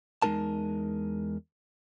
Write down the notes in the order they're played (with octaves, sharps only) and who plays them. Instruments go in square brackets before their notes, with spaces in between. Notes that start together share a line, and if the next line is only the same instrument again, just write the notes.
[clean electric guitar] E2 G#3 C#4 D#4 A#4 A5